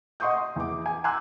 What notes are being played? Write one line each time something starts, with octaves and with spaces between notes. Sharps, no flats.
D#5 F#5 C6 C#6 D#6 G6
C6
E2 D6
G#5
G#5 A#5 C6 D6 E6 F#6